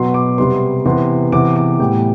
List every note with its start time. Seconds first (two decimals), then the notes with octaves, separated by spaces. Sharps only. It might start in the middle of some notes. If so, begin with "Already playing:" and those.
Already playing: B2 F#3 B3 C6
0.14 D6
0.38 C3 G3 B3 C6
0.85 C3 E3 B3 C6
1.32 C3 E3 B3 D6
1.56 D6
1.79 A2 E3 G3 B3 G5